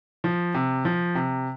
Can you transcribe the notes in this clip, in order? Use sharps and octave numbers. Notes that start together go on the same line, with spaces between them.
F3
C3
F3
C3